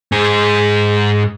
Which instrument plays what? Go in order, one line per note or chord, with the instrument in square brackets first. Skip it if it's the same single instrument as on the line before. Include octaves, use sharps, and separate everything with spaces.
[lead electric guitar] G#2 G#4